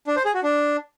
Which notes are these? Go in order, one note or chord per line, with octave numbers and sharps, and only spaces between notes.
D4
C5
G#4
F#4
D4